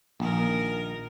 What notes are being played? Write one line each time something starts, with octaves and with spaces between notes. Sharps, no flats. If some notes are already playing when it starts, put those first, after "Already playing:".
A#1 D#3 A#4